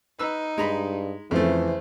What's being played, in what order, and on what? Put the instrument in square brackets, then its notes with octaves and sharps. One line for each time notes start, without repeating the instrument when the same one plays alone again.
[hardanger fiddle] D#4 [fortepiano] B4 E6
[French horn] G2 [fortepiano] G#3 A#5 B5
[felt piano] F2 F3 [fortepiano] C#3 A3 [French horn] E3 [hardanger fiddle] C5